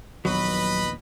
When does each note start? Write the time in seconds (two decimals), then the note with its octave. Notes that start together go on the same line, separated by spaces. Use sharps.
0.25 A#1 D#2 F#3 B3 B4 D#5 B5